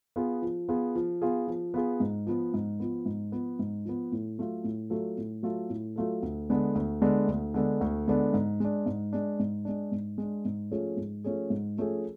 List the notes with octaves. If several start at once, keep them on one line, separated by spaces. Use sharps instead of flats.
B3 F4 G#4
F3
B3 F4 G#4
F3
B3 F4 G#4
F3
B3 F4 G#4
G#2
F3 B3
G#2
F3 B3
G#2
F3 B3
G#2
F3 B3
A2
F#3 A3 F4 A4
A2
F#3 A3 F4 A4
A2
F#3 A3 F4 A4
A2
F#3 A3 F4 A4
D2
D3 G#3 B3 D4
D2
D3 G#3 B3 D4
D2
D3 G#3 B3 D4
D2
D3 G#3 B3 D4
G#2
G#3 D4
G#2
G#3 D4
G#2
G#3 D4
G#2
G#3 D4
G#2
F3 A3 C#4 G#4
G#2
F3 A3 C#4 G#4
G#2
F3 A3 C#4 G#4